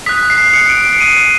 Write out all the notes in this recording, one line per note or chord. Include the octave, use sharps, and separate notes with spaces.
D#6 F#6 B6
C7
D#6 F#6 C#7
D7
D7
D#6 F#6 D#7